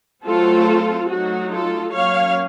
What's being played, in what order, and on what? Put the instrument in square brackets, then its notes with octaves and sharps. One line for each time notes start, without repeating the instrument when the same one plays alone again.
[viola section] F#3 A3 C4 F4 A4
F#3 A3 D#4 F#4
F4 A4
F#3 A#3 C#4 C#5 F5